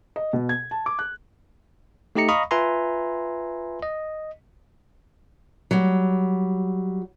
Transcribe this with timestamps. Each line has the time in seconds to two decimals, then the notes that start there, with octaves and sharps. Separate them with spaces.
0.16 D#5
0.33 B2
0.49 G#6
0.71 A5
0.86 D6
0.99 F#6
2.15 A3 D#4 G4 D#5 A#5 C#7
2.28 D#5 F5 A#5 B5 C#6 D#6
2.51 F4 B4 E5 G#5 A#5 C6
3.82 D#5
5.71 F#3 G3